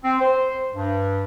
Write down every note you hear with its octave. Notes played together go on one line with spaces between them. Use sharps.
C4
C5
G2